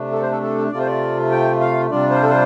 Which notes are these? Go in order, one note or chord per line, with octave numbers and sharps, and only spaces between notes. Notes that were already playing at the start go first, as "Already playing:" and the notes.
Already playing: C3 A3 D4
A4
C5
A4
A4
C3 A3 F4 D5
C5
D5
G5
F5
C3 G3 D4 F4 D5
C5
A4
C5